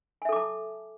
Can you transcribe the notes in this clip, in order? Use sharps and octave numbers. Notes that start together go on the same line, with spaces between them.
A4 E5 G#5 A5 D6